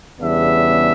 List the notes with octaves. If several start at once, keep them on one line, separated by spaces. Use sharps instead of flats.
E2 C#3 G3 B3 D4 E5